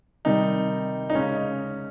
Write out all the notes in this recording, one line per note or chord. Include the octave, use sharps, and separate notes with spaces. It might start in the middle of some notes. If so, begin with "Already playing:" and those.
C3 D#3 G3 D#4
D#4
C#3 G#3 C#4